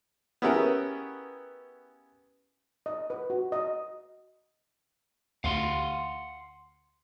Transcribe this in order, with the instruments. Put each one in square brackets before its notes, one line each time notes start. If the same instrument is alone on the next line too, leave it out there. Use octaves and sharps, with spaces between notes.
[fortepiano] B3 C#4 E4 G4 G#4 A#4
[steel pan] D#5
B4
F#4
D#5
[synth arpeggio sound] D2 [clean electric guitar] F5 F#5 C6